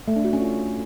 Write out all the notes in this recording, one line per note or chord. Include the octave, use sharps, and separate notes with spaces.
A3
D4
F#4
C#4
F4